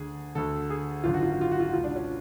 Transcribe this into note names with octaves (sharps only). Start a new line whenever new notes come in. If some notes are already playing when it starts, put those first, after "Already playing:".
Already playing: D2 D3 G#4
D2 D3 A4
G#4
G#1 F#2 D3 F4
F#4
F4
F#4
F4
F#4
F4
C#2 B2 F4
D4
C#4